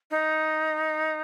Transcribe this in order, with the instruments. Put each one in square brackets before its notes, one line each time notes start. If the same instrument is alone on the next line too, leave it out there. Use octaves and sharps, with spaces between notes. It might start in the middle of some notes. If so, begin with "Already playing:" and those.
[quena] D#4